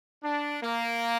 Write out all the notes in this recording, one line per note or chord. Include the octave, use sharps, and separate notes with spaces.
D4
A#3